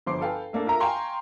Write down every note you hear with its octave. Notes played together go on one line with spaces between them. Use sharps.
G1 F3 C6 D6 C7
A4 B4 F5 G5 G#5
A3 A#3 D4 A4
F4 A#4 E5 A#5
F5 G5 G#5 A#5 C6 C#6